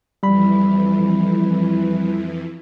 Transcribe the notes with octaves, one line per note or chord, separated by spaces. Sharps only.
F2 E3 G3 B5